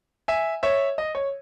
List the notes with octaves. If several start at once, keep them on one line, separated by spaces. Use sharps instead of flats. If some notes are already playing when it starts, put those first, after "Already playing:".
E5 G#5
C#5 E5
D#5
C#5